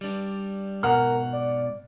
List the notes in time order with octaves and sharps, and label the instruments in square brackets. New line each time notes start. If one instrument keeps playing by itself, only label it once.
[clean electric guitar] G3 D4
[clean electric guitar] G#2 B2 [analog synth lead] A#4 [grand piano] F#5 F6
[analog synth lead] D5